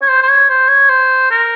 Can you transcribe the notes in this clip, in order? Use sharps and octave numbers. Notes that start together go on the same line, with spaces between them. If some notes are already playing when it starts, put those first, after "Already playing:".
C#5
C5
C5
C#5
C5
C#5
C5
A#4